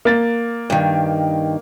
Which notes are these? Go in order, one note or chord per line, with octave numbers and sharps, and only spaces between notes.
A#3 A6
G2 D#3